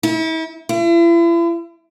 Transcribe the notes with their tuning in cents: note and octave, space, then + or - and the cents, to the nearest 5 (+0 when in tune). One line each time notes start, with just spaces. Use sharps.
E4 -40
E4 +40